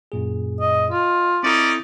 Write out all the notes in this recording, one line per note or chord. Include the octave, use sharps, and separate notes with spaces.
F#2 A#2 G#4
D#5
F4 D#5
C4 C#4 D#4 E4 A4 D5